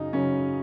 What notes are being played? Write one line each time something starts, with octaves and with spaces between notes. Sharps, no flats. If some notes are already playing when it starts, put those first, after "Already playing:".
Already playing: F#2 C#3 F#3 D#4
F#2 C#3 F#3 C#4